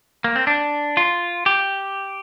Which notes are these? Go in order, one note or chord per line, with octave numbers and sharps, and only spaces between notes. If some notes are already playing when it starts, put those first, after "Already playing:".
A#3
C4
D4
F4
G4